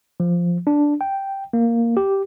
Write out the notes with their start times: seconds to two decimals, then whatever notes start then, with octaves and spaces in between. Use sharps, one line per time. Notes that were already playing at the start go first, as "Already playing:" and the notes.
0.20 F3
0.67 D4
1.01 G5
1.53 A#3
1.97 G4